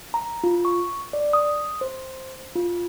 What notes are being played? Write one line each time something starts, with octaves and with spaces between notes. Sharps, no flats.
A#5
F4
C#6
D5
D#6
C5
F4